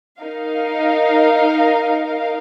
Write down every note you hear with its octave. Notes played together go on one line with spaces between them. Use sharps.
D#4 A#4 F5